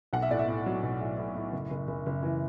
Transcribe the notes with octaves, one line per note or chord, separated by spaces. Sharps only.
B1 F#5
E5
A2 D5
E5
A2
F#3
B1
A2
A2
A2
F#1
F#1
F#1
F#1
E3